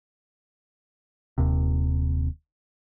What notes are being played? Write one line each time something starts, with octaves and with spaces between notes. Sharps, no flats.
D#1 D#2 C3